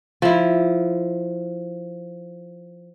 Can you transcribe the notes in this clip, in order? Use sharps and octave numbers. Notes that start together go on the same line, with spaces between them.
F3 E4